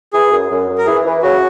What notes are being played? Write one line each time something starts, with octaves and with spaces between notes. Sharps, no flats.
E3 G#4
F#2
F#2
F#2
A#4
E3 G#4
E3
C#3 F#4